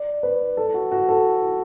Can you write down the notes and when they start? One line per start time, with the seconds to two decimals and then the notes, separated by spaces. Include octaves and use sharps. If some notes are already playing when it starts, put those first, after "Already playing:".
Already playing: D5
0.23 B4
0.57 A4
0.74 F#4
0.91 F#4
1.09 A4